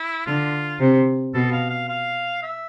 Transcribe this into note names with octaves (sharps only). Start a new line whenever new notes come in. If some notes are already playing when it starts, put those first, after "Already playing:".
Already playing: E4
D3 F4
C3
B2 A4
F5
F5
F5
E5